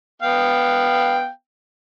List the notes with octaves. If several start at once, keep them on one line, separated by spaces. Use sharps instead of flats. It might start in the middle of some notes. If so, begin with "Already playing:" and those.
B3 F5 G5